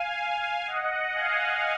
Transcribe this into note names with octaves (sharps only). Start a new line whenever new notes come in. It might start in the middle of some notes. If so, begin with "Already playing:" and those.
Already playing: F5 G#5
F5 G#5
D#5 F#5
F5 G#5